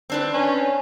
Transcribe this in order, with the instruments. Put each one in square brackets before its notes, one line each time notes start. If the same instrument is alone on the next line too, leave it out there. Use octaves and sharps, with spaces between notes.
[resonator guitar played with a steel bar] C4 D4 B4
[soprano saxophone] C#4